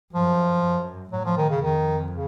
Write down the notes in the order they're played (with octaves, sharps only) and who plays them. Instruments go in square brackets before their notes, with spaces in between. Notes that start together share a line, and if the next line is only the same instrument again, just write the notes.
[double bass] F#2 [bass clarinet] F3
[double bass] F#2
[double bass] A2 [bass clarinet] F#3
[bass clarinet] F3
D#3
C#3
[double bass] F2 [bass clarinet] D#3
[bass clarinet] C#3